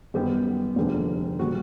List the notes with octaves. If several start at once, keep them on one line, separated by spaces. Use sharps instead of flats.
F#2 D#3 G3 B3 G4
F1 D#2 D3 F3 G#3
A#2 G3 F#4